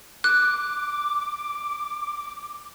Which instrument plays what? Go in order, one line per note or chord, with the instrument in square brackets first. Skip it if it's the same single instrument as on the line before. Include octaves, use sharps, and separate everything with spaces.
[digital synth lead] D6 [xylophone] F#6